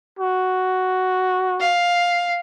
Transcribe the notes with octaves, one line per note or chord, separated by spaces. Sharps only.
F#4
F5